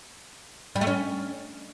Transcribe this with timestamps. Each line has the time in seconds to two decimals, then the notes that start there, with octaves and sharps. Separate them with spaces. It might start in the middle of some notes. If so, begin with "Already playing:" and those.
0.76 G3
0.81 A3
0.87 C#4